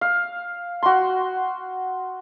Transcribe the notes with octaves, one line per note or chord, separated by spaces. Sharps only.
F5
F#4 C6